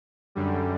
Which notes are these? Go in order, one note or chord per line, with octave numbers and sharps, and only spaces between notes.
F#2 D3 G3